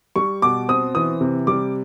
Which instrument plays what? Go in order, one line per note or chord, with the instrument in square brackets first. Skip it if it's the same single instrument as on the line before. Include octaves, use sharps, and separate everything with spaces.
[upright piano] G3 C#6
B2 D6
C4 D#6
E3 D#6
C3
G3 D6